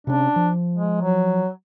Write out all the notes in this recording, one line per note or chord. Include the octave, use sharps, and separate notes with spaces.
C3 C#4 D4
F3
G#3
F#3